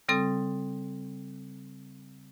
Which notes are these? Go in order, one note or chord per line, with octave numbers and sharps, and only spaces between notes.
C#3 G3 C4 A4 D#6